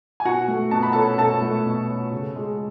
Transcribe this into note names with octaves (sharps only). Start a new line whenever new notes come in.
G#5
B2 F#4 F#5
A3
B2 A5
B5
C#4 A4 A5
B2 A4 A5
A3
B2
C#4
C#3
G#3